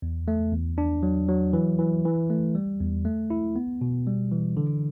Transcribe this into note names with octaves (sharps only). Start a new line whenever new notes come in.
E2
A3
E2
D4
F#3
F#3
E3
E3
E3
A3
G3
E2
A3
E4
B3
B2
G3
E3
D3